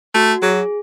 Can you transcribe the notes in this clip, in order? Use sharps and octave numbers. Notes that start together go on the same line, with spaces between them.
A3 F#4
F#3 G#4